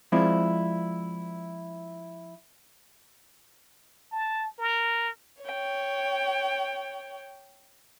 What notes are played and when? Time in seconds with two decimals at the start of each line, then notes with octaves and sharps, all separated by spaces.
0.12 F3 G#3 C4 E4 F4 D5
4.12 A5
4.59 A#4
5.43 C#5 G5